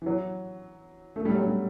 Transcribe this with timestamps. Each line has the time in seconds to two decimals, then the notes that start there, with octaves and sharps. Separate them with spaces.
0.02 E3
0.06 F#3
1.16 A3
1.25 G3
1.35 F#3
1.44 G3